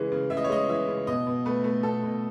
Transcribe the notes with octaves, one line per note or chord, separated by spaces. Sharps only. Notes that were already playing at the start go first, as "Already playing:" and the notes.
Already playing: C#3 E3 G#3
C#3
C#3 E5
D#5
C#5
G#3 D#5
E3 E5
C#3
B2 D#5
B2
A3 B4
A3
B2 A4
B2